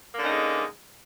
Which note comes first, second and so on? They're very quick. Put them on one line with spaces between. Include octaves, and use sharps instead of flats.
A#3 D3 C#4 D#4 G#3